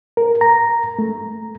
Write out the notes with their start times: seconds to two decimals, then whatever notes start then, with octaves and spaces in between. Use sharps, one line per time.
0.17 A#4
0.41 A#5
0.99 A3